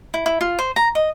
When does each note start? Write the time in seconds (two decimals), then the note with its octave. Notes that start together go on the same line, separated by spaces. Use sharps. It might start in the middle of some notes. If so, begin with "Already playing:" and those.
0.14 E4
0.26 E4
0.41 F4
0.59 C5
0.76 A#5
0.95 D#5